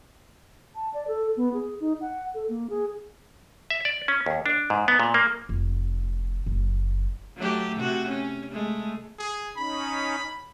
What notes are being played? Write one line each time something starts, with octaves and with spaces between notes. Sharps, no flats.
A5
D5
A4
B3
G#4
D#4
F#5
A4
A#3
G#4
E5
D5
C#4
D#2
D4
G#2
B3
A#2
A#3
F1
F#1
F#3 A3 G4
C3 F#4
C#4
G#3 A3
G#4
C#4 D#4 B5